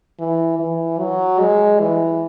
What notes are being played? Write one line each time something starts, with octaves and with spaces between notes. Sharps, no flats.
E3
E3
F#3
G#3
E3